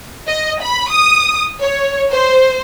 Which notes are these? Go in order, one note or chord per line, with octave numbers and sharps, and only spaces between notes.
D#5
B5
D#6
C#5
C5